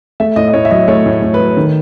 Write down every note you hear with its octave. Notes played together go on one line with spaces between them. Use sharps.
A3 E5
A2 D#5
D#5
A2 C#5
E5
F#3 D#5
A3 C#5
A2
A2
B4
F#3
D#3